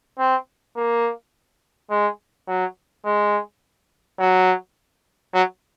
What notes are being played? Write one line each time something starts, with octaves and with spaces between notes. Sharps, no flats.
C4
A#3
G#3
F#3
G#3
F#3
F#3